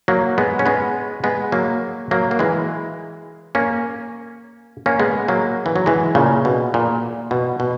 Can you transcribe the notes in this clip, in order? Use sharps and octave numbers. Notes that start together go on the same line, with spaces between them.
F#3 A#3
G#3 B3
C#4
G#3 B3
G#3 B3
F#3 A#3
F#3 A#3
A#3
E3 G#3
A#3 C#4
A#3 C#4
G#3 B3
F#3 A#3
E3
F#3
E3 G#3
A#2 C#3
B2
A#2
B2
B2